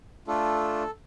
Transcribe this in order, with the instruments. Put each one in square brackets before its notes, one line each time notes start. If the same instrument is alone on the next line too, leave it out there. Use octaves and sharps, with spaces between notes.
[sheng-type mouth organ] A3 D4 F4 A4